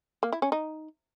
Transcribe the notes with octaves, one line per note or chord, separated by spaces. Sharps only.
A#3
E4
C#4
D#4